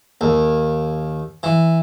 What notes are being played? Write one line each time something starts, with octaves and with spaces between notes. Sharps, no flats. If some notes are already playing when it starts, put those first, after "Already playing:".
D#2
E3